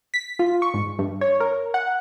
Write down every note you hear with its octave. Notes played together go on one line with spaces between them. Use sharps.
B6
F4
C#6
G#2
G2
C#5
A#4
F#5